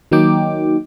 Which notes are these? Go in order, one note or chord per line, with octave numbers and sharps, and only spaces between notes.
D#3 F#3 A#3 D#4 G5 D6